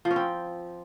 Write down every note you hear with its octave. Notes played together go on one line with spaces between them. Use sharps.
F3
C#4
C4